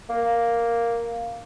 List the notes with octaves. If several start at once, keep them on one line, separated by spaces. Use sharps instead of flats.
A#3